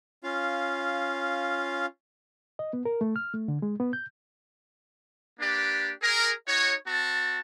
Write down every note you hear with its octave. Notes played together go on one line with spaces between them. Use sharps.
C#4 F4 F5
D#5
B3
A#4
A3
F6
A3
D3
G#3
B3
G6
A#3 D4 G4 B4 D5
G#4 A#4
D#4 F#4 C#5
C4 F#4 A5